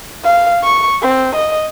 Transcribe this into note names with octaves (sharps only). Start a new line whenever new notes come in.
F5
C#6
C4
D#5